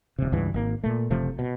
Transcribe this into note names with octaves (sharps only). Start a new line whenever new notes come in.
D1 C3
C#2 G2 E3
G#1 A#3
A#2 A3
F#1 C3 F3 A3
B2